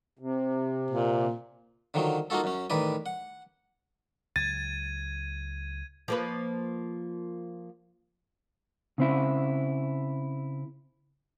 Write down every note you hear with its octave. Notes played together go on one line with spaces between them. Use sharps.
C3
A#2
D3 D#3 F3 F#3
A#3 D#4 F4 F#4 A4
F#2 C#4
A1 D#3 B4 D5 G#5
F#5
C#2 F#3 G#6 A6 D#7
F3 A#3 B4
C#3 C4 E4